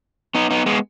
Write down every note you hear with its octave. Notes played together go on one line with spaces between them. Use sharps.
B3 D#4
B3 D#4
G#3 B3